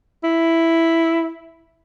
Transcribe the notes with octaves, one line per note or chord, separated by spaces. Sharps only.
E4